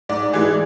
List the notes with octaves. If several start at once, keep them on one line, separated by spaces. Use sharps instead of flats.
G#2 D5
E3 G#3